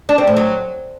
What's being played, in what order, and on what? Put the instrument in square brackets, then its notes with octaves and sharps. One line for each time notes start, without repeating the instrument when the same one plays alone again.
[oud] D4
C4
A2
F#3